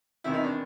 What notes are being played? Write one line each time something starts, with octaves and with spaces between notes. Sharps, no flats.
E2 C3 D#3 E4
D#4
D4